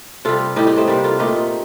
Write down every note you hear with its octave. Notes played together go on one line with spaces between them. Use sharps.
C3 G3 F4 A4
A2 G3 D#4 G4
D#4 G4
A3 C4
C3 G3 A#3
F4 A4
A#2 A3 D#4 G4